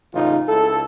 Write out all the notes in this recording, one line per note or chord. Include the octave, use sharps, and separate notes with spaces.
A1 C#3 D#4 F4
C#2 E4 A4